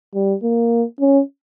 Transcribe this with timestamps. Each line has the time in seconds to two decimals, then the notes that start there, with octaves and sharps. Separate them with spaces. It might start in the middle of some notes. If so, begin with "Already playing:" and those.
0.15 G3
0.43 A#3
1.00 C#4